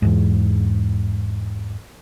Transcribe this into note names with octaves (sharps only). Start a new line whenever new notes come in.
E2 G#2